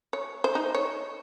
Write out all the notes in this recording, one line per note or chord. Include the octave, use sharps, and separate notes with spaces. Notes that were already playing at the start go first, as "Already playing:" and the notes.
C#5
C5
D#4
C#5